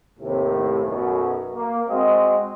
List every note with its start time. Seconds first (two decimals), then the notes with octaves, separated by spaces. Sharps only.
0.19 D#2 A2 C3
0.85 B1 F#2 B2
1.55 A#3
1.88 G#3 C4 F#4 D#5